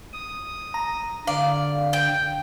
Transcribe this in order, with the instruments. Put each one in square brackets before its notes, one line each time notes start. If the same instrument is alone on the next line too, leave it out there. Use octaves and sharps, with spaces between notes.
[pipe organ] D#6
[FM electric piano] A#5
[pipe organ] D3 [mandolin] D5 [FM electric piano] F5
[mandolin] G5